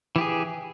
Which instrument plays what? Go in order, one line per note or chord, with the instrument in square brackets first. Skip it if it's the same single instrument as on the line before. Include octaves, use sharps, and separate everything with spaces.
[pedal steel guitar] E3
G4
G#4